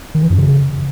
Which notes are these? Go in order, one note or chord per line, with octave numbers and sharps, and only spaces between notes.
D#3
E3
F#2
C#3